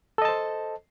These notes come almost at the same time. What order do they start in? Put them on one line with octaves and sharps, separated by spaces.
A4 D#5 A5 C5